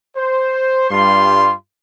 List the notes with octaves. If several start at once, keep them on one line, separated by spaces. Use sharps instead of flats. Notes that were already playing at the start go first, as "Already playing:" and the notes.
C5
G2 G3 F4 C6